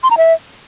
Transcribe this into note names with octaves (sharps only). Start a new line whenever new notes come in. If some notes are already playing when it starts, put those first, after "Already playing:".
C6
A#5
E5